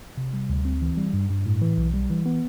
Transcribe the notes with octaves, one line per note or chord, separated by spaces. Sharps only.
C3
G3
D2
C4
E3
G3
G2
G2
A2
E3
B1
G3
E3
B3